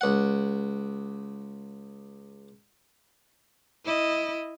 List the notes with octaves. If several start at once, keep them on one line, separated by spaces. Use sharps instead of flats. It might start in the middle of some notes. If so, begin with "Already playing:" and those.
C#2 F#5
E4 D#5